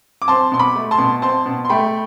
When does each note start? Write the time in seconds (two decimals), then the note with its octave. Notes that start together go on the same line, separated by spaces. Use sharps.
0.22 D6
0.28 C4 A5 C6
0.52 B2 C6
0.59 B5 D6
0.75 A3
0.91 A5 C6
0.98 B2
1.22 C4 A5 C6
1.46 B2
1.65 C6
1.69 A3 G5 B5